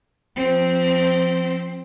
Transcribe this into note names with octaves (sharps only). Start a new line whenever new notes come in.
F3 C4